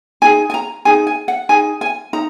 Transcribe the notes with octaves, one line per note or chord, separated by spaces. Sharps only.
D#4 G#4 G#5
G#5
A#5
D#4 G#4 G#5
G#5
F#5
D#4 G#4 G#5
G#5
D#4 A#5